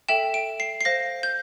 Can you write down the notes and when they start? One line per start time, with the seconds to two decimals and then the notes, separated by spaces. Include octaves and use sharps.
0.08 A4 E5 G5 E7
0.34 D7
0.60 C7
0.81 C7
0.85 C5 F5 A#6
1.23 G6